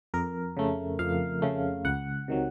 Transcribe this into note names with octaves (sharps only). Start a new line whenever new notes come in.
F2 A#4
C#3 A3
F2 F5
C#3 A3
C#2 F#5
C3 D#3 F#3